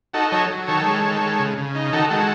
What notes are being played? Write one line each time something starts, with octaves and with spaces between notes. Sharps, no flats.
D#4 F#4 A4
F#3 A4 C#5
F#3
D#3 A4 C#5
G#3
D#3
G#3
C#3
C#3
D#4
D#3 F#4 A4
G#3 F#4 A4